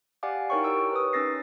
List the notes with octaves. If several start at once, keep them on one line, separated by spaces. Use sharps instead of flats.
G4 D5 F5 F#5 G#5 D6
D#4 E4 A#4 C#5 G5 C#6
G4 A#4 C#5 E6 D7
B4 D#6
C#4 D#4 E6 A6 A#6 C7